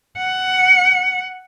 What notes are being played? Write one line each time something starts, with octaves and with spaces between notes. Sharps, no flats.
F#5